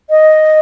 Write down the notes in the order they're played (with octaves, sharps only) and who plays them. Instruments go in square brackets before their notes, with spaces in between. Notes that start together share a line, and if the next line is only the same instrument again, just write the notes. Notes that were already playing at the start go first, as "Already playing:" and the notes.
[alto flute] D#5